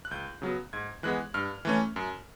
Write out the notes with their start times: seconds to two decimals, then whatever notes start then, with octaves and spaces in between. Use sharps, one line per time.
0.05 F#6
0.11 C#2 G6
0.42 C#3 F#3 B3
0.73 G#2 G#6
1.03 E3 G#3 B3 F#6
1.34 G2 F6
1.65 E3 A3 C#4
1.96 F#2